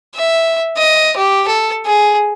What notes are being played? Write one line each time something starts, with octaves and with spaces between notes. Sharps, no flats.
E5
D#5
G4
A4
G#4